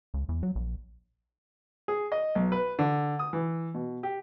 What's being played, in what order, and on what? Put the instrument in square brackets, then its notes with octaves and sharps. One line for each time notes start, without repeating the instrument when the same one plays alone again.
[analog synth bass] C#2
E2
F#3
A#1
[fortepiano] G#4
D#5
B1
B4
D3
D#6
E3
B2
G4